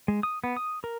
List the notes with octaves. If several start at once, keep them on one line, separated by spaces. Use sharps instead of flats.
G#3
D#6
B3
D#6
A#4